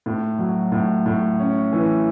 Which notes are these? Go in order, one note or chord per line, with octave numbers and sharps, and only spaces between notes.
A2
F#3
A2
A2
C#4
E3